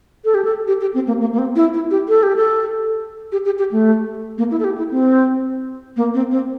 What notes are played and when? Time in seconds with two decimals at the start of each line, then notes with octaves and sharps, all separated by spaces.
0.25 A4
0.35 G4
0.45 A4
0.68 G4
0.81 G4
0.94 C4
1.07 A#3
1.20 A#3
1.33 A#3
1.38 C4
1.56 E4
1.74 E4
1.91 G4
2.08 A4
2.23 G4
2.36 A4
3.32 G4
3.45 G4
3.59 G4
3.72 A3
4.38 A#3
4.51 E4
4.60 A4
4.64 G4
4.78 E4
4.91 C4
5.97 A#3
6.14 C4
6.31 C4